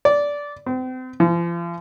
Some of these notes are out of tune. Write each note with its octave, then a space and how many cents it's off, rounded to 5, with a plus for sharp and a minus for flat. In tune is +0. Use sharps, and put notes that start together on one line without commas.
D5 -15
C4 -35
F3 -40